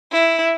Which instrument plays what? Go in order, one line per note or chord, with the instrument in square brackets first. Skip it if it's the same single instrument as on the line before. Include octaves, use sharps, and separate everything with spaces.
[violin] E4